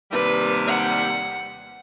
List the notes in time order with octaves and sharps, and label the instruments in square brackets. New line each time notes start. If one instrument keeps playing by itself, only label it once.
[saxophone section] D#2 C3 G3 [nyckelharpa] B4
[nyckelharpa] F#5